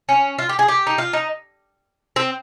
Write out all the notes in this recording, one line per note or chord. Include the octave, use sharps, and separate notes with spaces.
C#4
F4
G4
G#4
G4
D#4
F4
D#4
C4